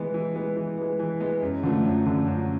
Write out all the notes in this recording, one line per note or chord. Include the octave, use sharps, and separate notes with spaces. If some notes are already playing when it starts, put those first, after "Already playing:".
Already playing: E3 G#3 B3
E3
G#3 B3
E3
G#3 B3
E3
G#3 B3
F#2
D3 F3 A3
F#2
D3 F3 A3
F#2